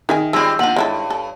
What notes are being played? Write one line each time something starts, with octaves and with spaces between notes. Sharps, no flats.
D#3 G#4 E5 G#5
G3 G#3 C4 C#4 F4 E6
C3 A#3 D4 F4 F#5 F#7
G2 G#3 E4 A4 C#5
A4